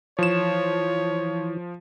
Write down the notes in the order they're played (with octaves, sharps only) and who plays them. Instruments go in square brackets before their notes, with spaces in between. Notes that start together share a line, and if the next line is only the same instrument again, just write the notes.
[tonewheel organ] E3 [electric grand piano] F3 E7 [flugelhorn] C#5